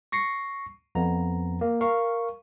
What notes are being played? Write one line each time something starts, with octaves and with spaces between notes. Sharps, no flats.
C#6 A#6 C7 C#7
F2 B3 A#5
A#3
A#4 F5 C#6